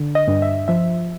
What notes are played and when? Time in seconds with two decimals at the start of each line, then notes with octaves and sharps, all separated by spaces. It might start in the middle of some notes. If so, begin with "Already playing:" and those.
Already playing: D3
0.15 D#5
0.28 G2
0.42 E5
0.68 F3 E5